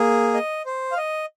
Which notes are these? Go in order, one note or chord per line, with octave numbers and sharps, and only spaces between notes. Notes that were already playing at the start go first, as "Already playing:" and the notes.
Already playing: A#3 G#4
D#5
C5
F5
D#5